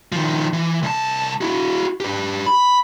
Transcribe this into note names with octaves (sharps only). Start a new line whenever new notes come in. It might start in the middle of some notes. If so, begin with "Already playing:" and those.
D#3 F3
E3
C2 A5
E4 F#4
G4 B4
B5